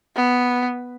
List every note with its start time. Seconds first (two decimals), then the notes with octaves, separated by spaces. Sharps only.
0.16 B3